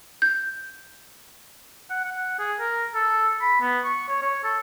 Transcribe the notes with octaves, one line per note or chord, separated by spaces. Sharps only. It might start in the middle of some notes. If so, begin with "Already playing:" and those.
G6
F#5
F#5
G#4
A#4
A4
B5
B3
C#6
C#5
C#5
A4